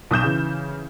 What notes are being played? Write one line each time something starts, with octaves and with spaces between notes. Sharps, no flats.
B1 D#6 G6 E7
C#3 E3